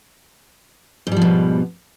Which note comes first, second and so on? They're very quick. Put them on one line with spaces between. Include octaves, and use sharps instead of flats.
G#2 G3 F3 B2